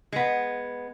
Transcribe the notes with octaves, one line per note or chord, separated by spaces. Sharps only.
G#3 B3